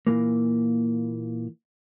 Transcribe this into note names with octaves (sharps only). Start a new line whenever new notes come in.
A#2 E3 A#3